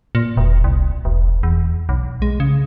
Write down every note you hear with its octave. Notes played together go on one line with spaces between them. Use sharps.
A#2
E1
C2
E1
E2
B1
G#3
C#3